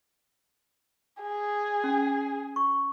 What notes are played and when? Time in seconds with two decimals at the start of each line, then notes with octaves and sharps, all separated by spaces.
1.23 G#4
1.84 C#4
2.56 C#6